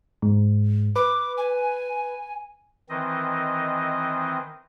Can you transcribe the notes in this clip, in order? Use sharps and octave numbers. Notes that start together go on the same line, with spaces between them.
G#2
B4 D6
G#5
D#3 E3 C4 D#5